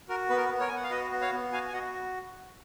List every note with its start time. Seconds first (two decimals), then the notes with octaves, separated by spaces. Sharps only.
0.09 F#4 A#4
0.29 B3 B4
0.37 A#4
0.45 B4
0.49 B3
0.60 A#4 C#5
0.68 B3 G#5
0.76 F#5
0.84 F5
0.90 F#4 B4 D#5
1.11 B3
1.21 C#5 F5
1.32 B3
1.52 F#4 F5 G#5
1.68 G#5
1.72 F#4 D#5 F#5